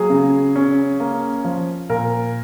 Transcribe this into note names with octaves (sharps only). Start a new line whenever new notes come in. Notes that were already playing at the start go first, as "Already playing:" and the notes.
Already playing: F#3 A#3 G#4
C#3
C#4
A#3
F3
A#2 A#4